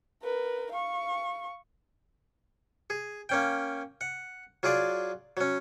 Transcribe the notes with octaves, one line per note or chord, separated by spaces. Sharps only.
A#4 B4
F5 C#6
G#4
A#3 C#4 G5
F#5
F#3 F4 G#4 D5
F#3 C#4